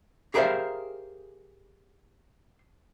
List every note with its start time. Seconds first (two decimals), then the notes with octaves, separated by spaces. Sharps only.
0.34 G4 G#4 A#4 C5 E5 F5